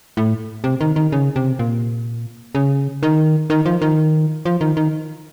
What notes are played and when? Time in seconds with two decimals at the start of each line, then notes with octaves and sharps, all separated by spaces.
0.17 A2
0.64 C3
0.81 D#3
0.96 D#3
1.12 C#3
1.36 C3
1.59 A#2
2.55 C#3
3.03 D#3
3.50 D#3
3.66 F3
3.82 D#3
4.46 F3
4.61 D#3
4.77 D#3